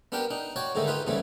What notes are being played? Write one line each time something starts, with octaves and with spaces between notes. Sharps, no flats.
B3 D4 G4 A#4 G5
D4 D#4
F#4 C#5 D5 F#5 G5
G#2 D3 D#3 G#3 A3
D#4 F4 G4 B4
D#2 G#2 C#3 E3 G3 A3